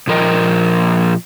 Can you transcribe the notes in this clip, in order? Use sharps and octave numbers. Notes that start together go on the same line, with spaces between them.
A#2 F3 A#4 D#5 G5